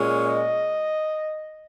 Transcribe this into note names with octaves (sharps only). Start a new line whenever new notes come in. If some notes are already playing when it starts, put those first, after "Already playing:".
Already playing: A#2 G#3 C#4
D#5